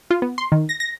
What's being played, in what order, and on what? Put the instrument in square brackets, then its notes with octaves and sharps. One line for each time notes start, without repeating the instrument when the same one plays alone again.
[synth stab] F4
B3
C6
D#3
A#6
A#6